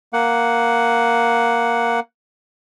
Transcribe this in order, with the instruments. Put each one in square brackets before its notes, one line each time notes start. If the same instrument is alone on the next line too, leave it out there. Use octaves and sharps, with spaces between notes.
[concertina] A#3 F#5